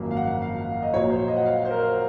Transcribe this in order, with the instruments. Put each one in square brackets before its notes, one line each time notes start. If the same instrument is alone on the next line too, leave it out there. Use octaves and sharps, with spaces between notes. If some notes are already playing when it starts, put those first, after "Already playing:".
Already playing: [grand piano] G#1 F#2 F3 A#3
F5
F#5
F5
D#5
A#1 A#2 F#3 C#5
C5
D#5
F#5
F5
C5
A#4